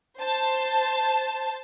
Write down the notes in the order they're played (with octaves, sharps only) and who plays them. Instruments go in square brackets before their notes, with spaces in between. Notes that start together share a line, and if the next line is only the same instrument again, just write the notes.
[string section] C5 A5